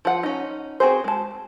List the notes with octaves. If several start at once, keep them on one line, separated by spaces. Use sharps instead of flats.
F3 F#5
C#4 D#4
C4 D#4 F#4 G#4 C5
G#3 A5